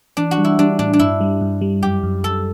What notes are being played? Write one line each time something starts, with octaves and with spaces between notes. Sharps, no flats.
E3 D4
F#4
G3
E4
G3 D4
A2 D4
D4
G2 E4
G3
G2
G3
F#2 G4
F#2
F#2 A4